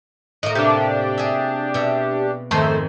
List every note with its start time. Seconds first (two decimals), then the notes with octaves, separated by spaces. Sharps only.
0.43 A2 A#3 D#5
0.55 C3 D4 G4
1.18 G#4 E5
1.74 B2 E5
2.51 F2 G#2 D#3 A3 C5